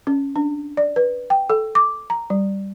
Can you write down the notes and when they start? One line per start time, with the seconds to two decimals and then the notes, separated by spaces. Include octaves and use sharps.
0.07 C#4
0.36 D4
0.77 D5
0.96 B4
1.30 G5
1.50 A4
1.75 D6
2.10 A#5
2.30 G3